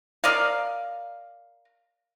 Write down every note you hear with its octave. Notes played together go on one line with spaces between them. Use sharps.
A#4 D5 D#5 F5